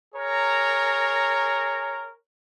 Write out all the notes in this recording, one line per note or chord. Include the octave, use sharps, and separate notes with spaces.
G#4 A#4 C#5 A#5